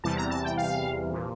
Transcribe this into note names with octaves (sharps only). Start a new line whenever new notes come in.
E2 C3 E3 G3 A5
A#5
A5
G5
F5
A#2 F3